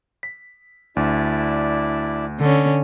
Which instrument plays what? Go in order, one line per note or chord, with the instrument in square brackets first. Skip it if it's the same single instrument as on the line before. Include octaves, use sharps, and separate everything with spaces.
[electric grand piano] B6
[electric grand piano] D2 [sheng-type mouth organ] D4 E4 D5
[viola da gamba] D3 C#4